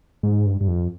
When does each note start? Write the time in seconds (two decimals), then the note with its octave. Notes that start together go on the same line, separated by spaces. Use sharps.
0.23 G#2
0.46 G2
0.61 G2
0.68 F2